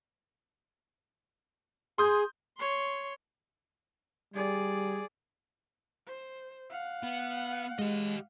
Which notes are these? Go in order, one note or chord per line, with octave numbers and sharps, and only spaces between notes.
G#4 C6 D#6 G6
C#5 C6
G3 G#4 D5
C5
F5 F#5
B3
G#3 G4 D#5